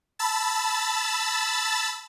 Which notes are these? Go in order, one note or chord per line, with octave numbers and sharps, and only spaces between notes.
A5 B5 E6 A6